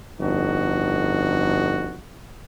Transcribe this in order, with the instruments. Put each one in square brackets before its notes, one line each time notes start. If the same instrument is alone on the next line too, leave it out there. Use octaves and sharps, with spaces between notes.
[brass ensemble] G1 F2 D#4 F#4